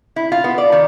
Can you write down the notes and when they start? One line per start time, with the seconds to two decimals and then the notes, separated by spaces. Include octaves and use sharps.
0.16 E4
0.32 F4
0.44 B3
0.58 D5
0.72 D#3